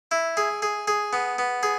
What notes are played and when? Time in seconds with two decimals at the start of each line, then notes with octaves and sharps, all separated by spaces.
0.11 E4
0.37 G#4
0.62 G#4
0.88 G#4
1.13 B3
1.38 B3
1.63 G#4